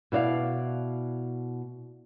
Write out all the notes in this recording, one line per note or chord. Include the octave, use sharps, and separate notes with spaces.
B2 E4 D5 F5